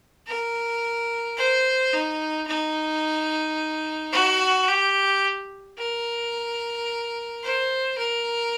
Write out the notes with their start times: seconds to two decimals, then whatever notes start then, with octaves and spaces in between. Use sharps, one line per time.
0.27 A#4
1.37 C5
1.93 D#4
2.47 D#4
4.12 F#4
4.68 G4
5.78 A#4
7.43 C5
7.98 A#4